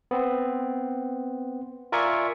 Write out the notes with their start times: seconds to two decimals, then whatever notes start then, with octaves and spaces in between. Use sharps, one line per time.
0.11 B3 C4
1.92 F4 A#4 D5 E5 G#5 C#6